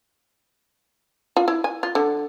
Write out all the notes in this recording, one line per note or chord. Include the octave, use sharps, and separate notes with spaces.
F4
E4
G#5
F4
D3